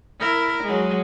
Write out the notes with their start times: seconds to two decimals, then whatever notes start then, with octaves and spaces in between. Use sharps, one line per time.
0.19 E4 A#4
0.63 F#3 G#3